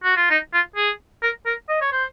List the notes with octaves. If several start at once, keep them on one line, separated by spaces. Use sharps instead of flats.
F#4
F4
D#4
F4
G#4
A#4
A#4
D#5
C#5
C5